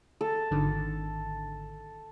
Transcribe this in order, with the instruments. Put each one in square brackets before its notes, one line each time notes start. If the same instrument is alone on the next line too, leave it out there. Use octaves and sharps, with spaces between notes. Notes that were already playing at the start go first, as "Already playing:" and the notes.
[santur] A4
[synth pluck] G#1 D3 D#3